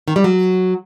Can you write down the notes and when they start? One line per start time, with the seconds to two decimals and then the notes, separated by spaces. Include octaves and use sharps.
0.08 D#3
0.16 G3
0.24 F#3